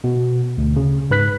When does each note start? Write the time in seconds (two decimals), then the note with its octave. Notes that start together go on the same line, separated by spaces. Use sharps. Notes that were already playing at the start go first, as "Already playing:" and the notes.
0.04 B2
0.58 D2
0.76 C#3
1.11 G#2 B4 F#6 B6